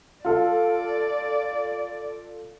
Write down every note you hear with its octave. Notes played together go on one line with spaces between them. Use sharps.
F4 A4 D5